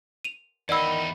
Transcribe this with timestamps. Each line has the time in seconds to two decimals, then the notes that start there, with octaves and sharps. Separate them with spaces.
0.25 D#7 F7
0.69 E2 D#3 D#4 D5 F#5 B5 E6 D#7